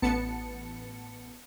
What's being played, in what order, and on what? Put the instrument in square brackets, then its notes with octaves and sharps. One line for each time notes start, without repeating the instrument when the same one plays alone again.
[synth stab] A1 B3 A5 C#7